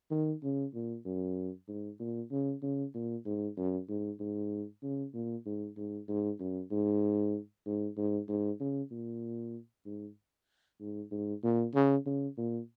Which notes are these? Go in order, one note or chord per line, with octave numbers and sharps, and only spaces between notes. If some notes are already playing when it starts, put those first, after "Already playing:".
D#3
C#3
A#2
F#2
G#2
A#2
C#3
C#3
A#2
G#2
F#2
G#2
G#2
C#3
A#2
G#2
G#2
G#2
F#2
G#2
G#2
G#2
G#2
C#3
A#2
G#2
G#2
G#2
A#2
C#3
C#3
A#2